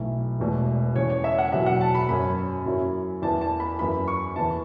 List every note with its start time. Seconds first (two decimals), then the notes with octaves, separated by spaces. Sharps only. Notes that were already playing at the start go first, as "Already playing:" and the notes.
Already playing: B1 B2 A3 E4
0.39 E1 E2 B2 A3
0.96 E2 C#3 E3 C#5
1.10 C#5
1.24 E5
1.38 F#5
1.52 F#1 E2 B2 F#3 E5
1.66 F#5
1.81 A5
1.95 B5
2.09 F#2 F#3 C#4 B5
2.66 F#2 F#3 C#4 E4
3.22 E2 E3 B3 E4 A5
3.41 A5
3.60 B5
3.79 F#2 E3 B3 E4 B5
4.08 C#6
4.36 E2 E3 B3 E4 A5